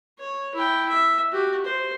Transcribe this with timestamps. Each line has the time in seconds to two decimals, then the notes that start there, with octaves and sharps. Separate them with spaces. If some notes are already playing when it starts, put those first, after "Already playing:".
0.19 C#5
0.54 E4 G5
0.89 E5
1.32 F#4 G4
1.65 C5